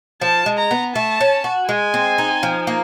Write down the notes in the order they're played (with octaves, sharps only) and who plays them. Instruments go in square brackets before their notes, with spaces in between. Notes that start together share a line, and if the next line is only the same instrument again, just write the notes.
[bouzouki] F3 [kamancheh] A5
[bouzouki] G#3
[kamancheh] A#5
[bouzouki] B3
[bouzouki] A3 [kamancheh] A5
[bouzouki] C#4
F#4
[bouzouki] G#3 [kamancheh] G#5
[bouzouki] C4
D#4
F3
A#3